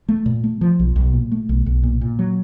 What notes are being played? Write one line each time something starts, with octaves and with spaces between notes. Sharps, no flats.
A3
A#2
A3
F3
B1
B1
A#2
A3
B1
B1
A#2
A#2
F#3